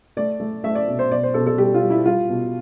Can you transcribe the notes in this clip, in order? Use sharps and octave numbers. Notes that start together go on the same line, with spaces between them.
A3 D5
A3
A3 E5
D5
B2
C5
B2 D5
C5
B2 A4
A4
G3 G4
F4
G3
E4
G3 F4
B2